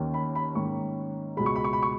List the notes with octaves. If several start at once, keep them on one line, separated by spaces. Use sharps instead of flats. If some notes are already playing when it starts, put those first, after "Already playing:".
Already playing: D#2 D#3 A#3 C#4
B5
B5
G#2 D#3 A#3 C#4 C#6
C#2 B2 G#3 B5
C#6
B5
C#6
B5
C#6